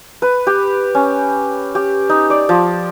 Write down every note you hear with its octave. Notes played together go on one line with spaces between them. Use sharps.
B4
G4
C#4
G4
D#4
D5
F3